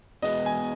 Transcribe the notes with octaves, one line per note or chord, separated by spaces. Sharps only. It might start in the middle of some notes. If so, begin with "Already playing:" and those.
E2 B2 G#3 B3 D#5
G#5